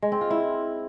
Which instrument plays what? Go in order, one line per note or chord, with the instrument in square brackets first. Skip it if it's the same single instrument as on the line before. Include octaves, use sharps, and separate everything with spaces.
[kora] G#3
C4
F4
E4